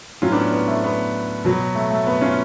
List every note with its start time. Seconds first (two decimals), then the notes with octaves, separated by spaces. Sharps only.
0.22 A2 F#3 C#4 F4
0.32 B3 D4
0.52 B3
0.68 A3
0.84 B3
1.45 B2 F#3
1.75 A3
1.91 A3
2.07 B3
2.21 C#4 F4